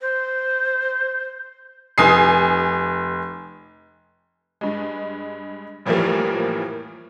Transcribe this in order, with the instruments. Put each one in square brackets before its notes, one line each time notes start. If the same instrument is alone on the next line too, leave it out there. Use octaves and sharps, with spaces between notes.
[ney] C5
[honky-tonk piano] F1 G#5 D#6 C7
G2 G#3
F2 A2 E3 F3 G3 A#3